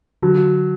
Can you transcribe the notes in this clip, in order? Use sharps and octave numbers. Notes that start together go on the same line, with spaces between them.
D3 F#3